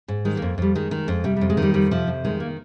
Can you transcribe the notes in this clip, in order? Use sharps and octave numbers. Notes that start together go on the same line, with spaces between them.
G#2
D#3 G#3
A#3
F2
F2 G3
D#3 G#3
D#3
F2
C3 G3
F2 G3
G#3
D#3
G3
F2 G3
C3 F3
F2
D#3 G#3
A#3